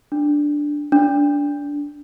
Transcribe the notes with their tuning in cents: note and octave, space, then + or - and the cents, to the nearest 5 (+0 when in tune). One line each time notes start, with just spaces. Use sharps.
D4 +0
D4 -20